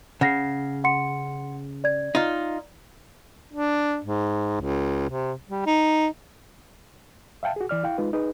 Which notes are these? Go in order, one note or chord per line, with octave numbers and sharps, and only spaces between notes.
C#3 F#5 A#6 C7
F#5 C6 C#7
D5 G#6
D#4 F4
D4
G#2
C#2
C3
G3
D#4
E5 F5 G5 A5
F#4 G#4
E3 D5 F6
E4 F5 G5
G#3 D#4 F4 B4
D#4 G#4 B4